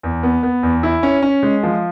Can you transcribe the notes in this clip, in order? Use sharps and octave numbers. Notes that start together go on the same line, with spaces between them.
E2
B3
B3
E2
E4
C#4
C#4
G#3
F3